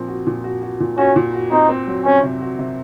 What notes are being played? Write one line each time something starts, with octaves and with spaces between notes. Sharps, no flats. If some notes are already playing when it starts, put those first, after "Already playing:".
Already playing: A#2 F3 C4
F#4
A#2
F#4
F#4
A#2
C#4 F#4
A#2
F#4
C4 D#4
C4
F#3
C4 C#4
C3
F#4
C3